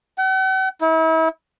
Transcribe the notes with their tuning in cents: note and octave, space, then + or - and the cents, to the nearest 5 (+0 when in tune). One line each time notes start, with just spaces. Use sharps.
F#5 +45
E4 -40